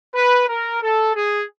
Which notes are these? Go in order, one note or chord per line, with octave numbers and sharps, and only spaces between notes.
B4
A#4
A4
G#4